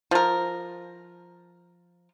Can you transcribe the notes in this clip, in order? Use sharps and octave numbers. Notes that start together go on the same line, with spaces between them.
F3 A#4